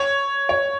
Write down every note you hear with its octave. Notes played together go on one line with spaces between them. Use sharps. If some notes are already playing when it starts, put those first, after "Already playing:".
Already playing: C#5
C#5